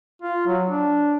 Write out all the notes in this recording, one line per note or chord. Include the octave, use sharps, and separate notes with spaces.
F4
F#3
D4